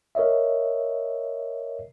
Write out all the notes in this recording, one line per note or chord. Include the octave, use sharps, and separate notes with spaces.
A#4 C#5 D#5 E5